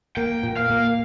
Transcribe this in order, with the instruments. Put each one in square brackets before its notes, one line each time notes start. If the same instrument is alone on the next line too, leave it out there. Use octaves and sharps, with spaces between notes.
[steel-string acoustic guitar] A#3 [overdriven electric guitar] G5
[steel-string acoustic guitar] A#2
[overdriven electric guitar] F5
[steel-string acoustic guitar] A#3